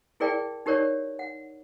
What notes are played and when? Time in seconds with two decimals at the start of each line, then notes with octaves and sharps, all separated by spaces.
0.20 E4 G#4 A#4 D5 G5 A5
0.66 D#4 G4 A#4 C#5 D5
1.19 F#5